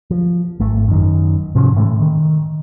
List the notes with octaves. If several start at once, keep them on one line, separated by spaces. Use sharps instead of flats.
F3
G#1 A3
F#2 D#3
G#2 C3 F3 C#4
A2 E3 G#3 A3
D#3